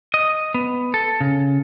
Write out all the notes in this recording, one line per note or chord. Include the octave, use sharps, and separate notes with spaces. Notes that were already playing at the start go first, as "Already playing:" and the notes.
D#5
B3
A4
C#3